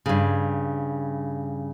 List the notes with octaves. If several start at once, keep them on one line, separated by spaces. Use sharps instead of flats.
G2 C#3